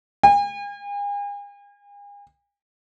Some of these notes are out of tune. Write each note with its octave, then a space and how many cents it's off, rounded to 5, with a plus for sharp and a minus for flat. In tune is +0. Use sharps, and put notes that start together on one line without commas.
G#5 -45